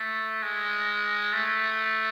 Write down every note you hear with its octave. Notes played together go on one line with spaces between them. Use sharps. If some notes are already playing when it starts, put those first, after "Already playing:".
Already playing: A3
G#3
A3